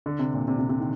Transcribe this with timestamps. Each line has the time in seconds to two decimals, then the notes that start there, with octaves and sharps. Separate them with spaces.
0.06 D3
0.19 C3
0.34 A#2
0.48 C3
0.59 C3
0.69 C3
0.80 D#3